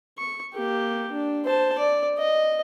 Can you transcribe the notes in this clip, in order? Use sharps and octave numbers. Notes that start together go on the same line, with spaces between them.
C#6
A#3 G4
D4
C5 A5
D5
D#5